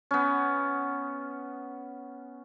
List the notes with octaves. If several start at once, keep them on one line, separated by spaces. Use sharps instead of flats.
B3 C#4